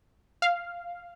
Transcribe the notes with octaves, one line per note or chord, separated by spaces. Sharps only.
F5